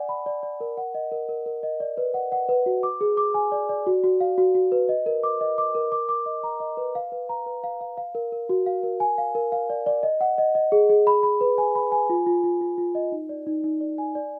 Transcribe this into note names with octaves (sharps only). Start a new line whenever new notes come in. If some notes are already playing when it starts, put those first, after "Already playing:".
Already playing: D5 F#5 G#5
B5
D5
D5
A#4
F#5
D#5
A#4
A#4
A#4
D#5
D5
B4
F#5
F#5
B4
F#4
D6
G#4
D6
G#5
D5
D5
F#4
F#4
F5
F#4
F#4
B4
D#5
A#4
D6
D#5
D6
A#4
D6
D6
D#5
A#5
D#5
B4
F5
B4
A#5
B4
F5
F5
F5
A#4
A#4
F#4
F5
A#4
G#5
F5
A#4
F5
D5
D5
D#5
F#5
D#5
D#5
G#4
G#4
B5
B5
B4
G#5
B5
G#5
F4
F4
F4
F4
F4
D#5
D#4
D5
D#4
D#4
D5
G#5
D5